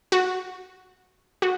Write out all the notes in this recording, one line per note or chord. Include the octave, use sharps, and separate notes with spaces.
F#4
F#4